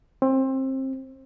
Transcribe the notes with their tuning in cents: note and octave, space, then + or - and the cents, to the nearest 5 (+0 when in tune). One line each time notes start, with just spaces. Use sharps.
C4 +25